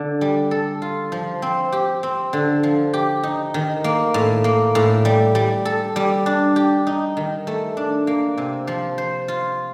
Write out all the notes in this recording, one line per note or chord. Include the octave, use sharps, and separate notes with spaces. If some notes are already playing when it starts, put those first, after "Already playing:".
Already playing: D3 D4
G3
A4
F4
F3
C4
G4
C4
D3
F3
G4
D#4
D#3
A#3
A2
A#3
A2
G3
G3
A4
G3
D4
G4
D#4
D#3
A3
D4
A#3
C3
F3
C5
F4